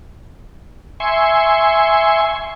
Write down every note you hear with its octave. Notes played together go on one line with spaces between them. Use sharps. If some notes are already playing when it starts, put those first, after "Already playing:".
E5 G#5 C6 C#6